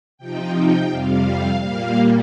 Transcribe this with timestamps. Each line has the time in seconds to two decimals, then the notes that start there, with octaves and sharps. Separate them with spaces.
0.17 C3 F3 D#4 G5
0.54 G5
0.89 F2 C3 G3 F5
1.60 A#2 G3 A#3 F5